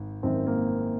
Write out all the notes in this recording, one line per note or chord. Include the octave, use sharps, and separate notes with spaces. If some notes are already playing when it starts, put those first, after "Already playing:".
Already playing: G#1
G#1 F#2 D#3 C4
A#3